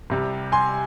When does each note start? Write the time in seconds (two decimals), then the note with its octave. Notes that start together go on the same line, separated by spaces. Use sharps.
0.10 C2 C3 G3
0.52 G#5 C6